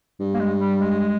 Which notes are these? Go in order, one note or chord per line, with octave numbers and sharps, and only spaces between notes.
G2
A#3
G#3
G3
G#3